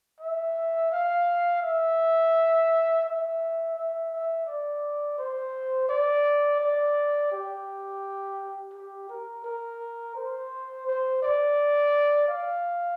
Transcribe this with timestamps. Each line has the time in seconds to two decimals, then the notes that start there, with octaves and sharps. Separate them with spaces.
0.20 E5
0.92 F5
1.62 E5
3.05 E5
3.76 E5
4.12 E5
4.47 D5
5.18 C5
5.89 D5
6.60 D5
7.32 G4
8.74 G4
9.09 A#4
9.44 A#4
10.15 C5
10.87 C5
11.22 D5
12.28 F5